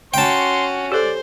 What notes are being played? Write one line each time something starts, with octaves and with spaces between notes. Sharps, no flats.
C#4 F#4 G5 A5 C6
G4 A4 C5 D5